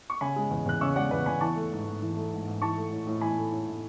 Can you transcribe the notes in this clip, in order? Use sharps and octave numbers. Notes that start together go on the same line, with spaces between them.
C#6
C#3 G#5 B5
G#3
E2
E2 F#6
C#3 C#6 E6
G#3 D5 F#5
E2 B4 D5
E2 G#5 B5
E3 A5 C#6
A3
G#2
G#2
E3
A3
G#2
G#2
E3 A5 C#6
A3
A2
A2
E3 G#5 B5
A3
A2
A2